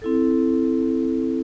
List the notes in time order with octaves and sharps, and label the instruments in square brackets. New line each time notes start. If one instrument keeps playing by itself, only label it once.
[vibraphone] C4 E4 A4